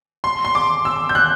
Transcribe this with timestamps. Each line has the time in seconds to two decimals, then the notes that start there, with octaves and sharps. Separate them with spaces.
0.24 C6
0.45 C6
0.55 D6
0.85 E6
1.09 G6
1.15 F#6